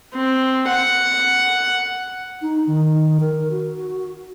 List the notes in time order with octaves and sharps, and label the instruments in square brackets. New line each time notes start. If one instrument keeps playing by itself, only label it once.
[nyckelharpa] C4
F#5
[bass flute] D#4
D#3
A#4
F#4